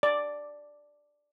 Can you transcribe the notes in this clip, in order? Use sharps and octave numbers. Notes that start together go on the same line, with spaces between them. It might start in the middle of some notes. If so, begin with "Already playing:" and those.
D5